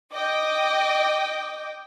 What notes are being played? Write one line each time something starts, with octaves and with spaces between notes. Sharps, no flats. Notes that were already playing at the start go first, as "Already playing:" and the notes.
D#5 G5 D6